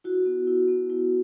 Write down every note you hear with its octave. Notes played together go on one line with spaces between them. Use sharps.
E4 F#4
B3
E4
B3
E4